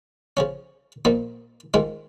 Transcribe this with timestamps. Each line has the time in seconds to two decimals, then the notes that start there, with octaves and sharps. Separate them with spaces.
0.37 C#3 F3 C#4
1.05 A#2 F3 A#3 D#4
1.74 G#2 D#3 G#3 F4